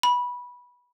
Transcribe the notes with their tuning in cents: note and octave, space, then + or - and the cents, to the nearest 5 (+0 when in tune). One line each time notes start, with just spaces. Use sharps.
B5 -15